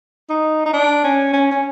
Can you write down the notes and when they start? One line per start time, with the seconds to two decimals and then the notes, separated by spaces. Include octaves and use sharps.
0.30 D#4
0.66 D#4
0.74 D4
1.04 C#4
1.33 C#4
1.51 C#4